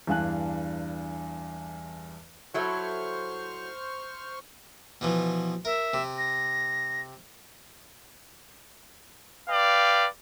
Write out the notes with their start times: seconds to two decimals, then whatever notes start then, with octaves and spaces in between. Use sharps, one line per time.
0.07 E2 G2 D4 F5 G#5 F#6
2.54 F#3 E4 A4 C5 C#6 F6
5.01 B2 E3 F3
5.65 A#4 E5
5.94 C3
6.18 A#6
9.49 B4 D5 F5 G5